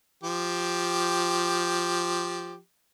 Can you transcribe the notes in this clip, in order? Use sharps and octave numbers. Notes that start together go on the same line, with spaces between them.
F3 G4